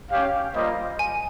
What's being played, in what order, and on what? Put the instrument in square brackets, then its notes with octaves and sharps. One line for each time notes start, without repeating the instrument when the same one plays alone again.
[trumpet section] C#4 G4 C#5 F5
G3 A#3 F4 C5 D#5
[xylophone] G#5